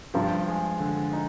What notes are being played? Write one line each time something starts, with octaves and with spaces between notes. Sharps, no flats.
G2 F3
G#3
D3
D#4